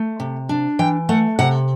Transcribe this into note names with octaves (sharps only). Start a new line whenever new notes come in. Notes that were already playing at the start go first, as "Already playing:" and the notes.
Already playing: A3
C3
D4
E3 G5
A3 F#5
C3 F#5